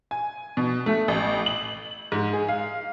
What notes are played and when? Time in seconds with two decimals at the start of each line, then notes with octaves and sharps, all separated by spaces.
0.11 G#5
0.57 B2
0.86 A3
1.08 A1
1.46 F#7
2.12 G#2
2.33 G#4
2.48 F5